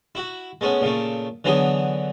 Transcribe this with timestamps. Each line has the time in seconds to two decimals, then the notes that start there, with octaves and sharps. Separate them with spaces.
0.15 E4 F#4
0.61 G#3 A3 B3 C#4
0.81 A#2 C#3 A3
1.44 D3 E3 F#3 B3 G#4